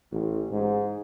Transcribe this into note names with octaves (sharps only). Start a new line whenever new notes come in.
A1
G#2